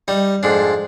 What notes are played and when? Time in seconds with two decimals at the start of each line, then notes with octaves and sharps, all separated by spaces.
0.08 G3 D#4
0.43 F2 G#2 D4